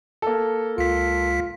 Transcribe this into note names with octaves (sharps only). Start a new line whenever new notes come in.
A#3 A4
C#2 F4 B6